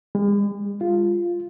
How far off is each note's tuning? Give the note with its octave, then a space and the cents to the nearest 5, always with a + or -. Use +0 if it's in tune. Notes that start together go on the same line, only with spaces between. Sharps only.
G#3 -45
F4 -5